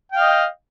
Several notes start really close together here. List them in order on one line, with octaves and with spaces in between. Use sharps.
G5 F5 D#5